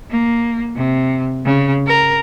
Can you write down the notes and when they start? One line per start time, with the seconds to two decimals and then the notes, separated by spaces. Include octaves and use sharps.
0.10 A#3
0.75 C3
1.45 C#3
1.87 A#4